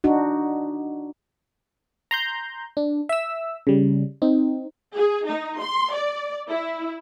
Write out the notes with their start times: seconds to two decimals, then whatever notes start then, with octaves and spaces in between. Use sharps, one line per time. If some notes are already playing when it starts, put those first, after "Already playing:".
0.04 D4 D#4 F#4
2.11 A#5 C6 G6
2.77 D4
3.09 E5 E6
3.67 C#3 G3
4.22 C4 D#4
4.95 G#4
5.28 D#4
5.58 C6
5.94 D5
6.49 E4